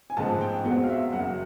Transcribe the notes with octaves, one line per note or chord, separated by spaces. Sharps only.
G#5
A1 G#2 F3 G#3 A5
G5
E2 B2 G#3 C4 F#5
F5
E5
F#1 F#2 C#3 F#3 F#5